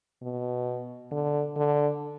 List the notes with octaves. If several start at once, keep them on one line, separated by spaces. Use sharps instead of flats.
B2
D3
D3